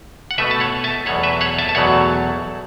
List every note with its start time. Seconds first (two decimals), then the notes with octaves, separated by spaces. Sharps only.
0.31 F#5
0.38 B2 A3 B4 E5
0.51 A5
0.60 C#5 F#5
0.84 E5 A5
1.06 E2 B2 F#3 A3 C#5 F#5
1.23 B4 E5
1.41 C#5 F#5
1.59 E5 A5
1.69 A5
1.75 E2 B2 F#3 A3 C#5 F#5